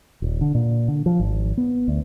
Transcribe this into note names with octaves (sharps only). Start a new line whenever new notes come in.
D#1
D3
A#2
D3
F3
G#1
B3
D2